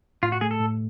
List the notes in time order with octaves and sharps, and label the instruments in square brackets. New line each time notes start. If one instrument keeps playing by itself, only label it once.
[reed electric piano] A2 [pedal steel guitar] F4
[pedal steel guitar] F#4
[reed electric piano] A3 [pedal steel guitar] G#4
[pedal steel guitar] A4
[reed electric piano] A2